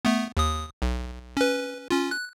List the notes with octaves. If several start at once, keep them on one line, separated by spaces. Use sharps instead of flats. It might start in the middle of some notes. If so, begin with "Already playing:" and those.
A3 B3
D#2 D#6
B1
C#4 B4
C#4 F4
F#6